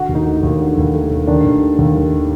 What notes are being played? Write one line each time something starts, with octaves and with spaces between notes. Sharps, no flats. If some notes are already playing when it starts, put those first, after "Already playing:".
Already playing: D3 F#4
D#2
D#4
A3
D#4
D#2
D3
D#2
A3
D#2
D#3 D4
D#2
A3
D#2
D#3